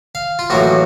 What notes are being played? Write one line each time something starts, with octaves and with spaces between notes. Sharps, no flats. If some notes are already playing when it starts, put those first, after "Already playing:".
F5
F4
A1 A2 F#3 A#3 F#4